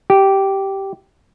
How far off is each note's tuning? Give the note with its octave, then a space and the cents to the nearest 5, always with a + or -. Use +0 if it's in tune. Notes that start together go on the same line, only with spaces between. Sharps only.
G4 -10